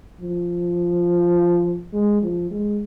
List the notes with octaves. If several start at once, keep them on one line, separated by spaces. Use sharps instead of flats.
F3
G#3
F3
G#3